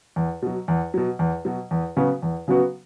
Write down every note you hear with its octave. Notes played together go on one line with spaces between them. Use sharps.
E2
B2 F#3
E2
B2 F#3
E2
B2 F#3
E2
C#3 F#3 B3 F#4
E2
C#3 F#3 B3 F#4